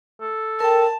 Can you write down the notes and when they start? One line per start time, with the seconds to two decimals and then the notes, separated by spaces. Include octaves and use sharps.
0.21 A4
0.60 A#4 G5 A5